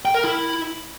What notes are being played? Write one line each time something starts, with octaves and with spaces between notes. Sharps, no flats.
G5
A#4
E4